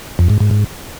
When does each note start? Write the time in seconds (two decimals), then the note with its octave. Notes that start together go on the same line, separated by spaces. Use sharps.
0.19 F2
0.30 G#2
0.40 G#2
0.51 G#2